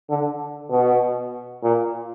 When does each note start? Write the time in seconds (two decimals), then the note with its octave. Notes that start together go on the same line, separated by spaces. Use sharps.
0.10 D3
0.71 B2
1.63 A#2